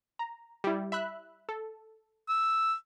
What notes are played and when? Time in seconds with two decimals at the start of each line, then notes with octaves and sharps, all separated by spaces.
0.19 A#5
0.64 G3 E4
0.92 E5 B5 F#6
1.49 A4
2.29 E6